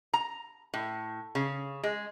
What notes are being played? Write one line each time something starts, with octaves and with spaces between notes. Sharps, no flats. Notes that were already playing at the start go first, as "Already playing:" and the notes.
A#5
A2
C#3
G#3